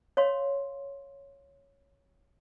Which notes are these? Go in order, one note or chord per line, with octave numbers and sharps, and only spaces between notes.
C#5 F5 C6